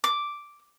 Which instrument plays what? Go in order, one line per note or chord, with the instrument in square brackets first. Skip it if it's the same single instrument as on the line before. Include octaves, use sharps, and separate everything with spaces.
[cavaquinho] D6